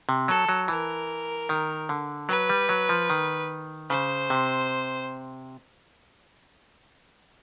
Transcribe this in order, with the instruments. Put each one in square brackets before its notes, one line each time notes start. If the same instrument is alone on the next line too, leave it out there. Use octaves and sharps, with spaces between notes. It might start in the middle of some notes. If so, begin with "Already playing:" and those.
[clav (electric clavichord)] C3
[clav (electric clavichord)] F#3 [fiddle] A4
[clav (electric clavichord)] F#3
[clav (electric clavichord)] E3 [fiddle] A#4
[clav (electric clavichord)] D#3
D3
[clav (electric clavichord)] F#3 [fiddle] B4
[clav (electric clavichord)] G3
F#3
F3
D#3
[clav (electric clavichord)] C#3 [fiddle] C5
[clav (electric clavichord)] C3